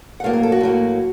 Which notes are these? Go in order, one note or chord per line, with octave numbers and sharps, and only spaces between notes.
F#5
A2 F#3 A#3 F5
A#4
A4
F#4
A2 F#3 A#3